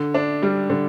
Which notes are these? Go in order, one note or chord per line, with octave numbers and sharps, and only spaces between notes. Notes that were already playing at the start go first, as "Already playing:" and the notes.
Already playing: D3
D4
G3
D3